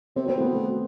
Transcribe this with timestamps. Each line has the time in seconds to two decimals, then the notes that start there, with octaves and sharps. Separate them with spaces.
0.16 C3 C4
0.26 B2 C4
0.37 A2 B3
0.47 B2
0.53 A3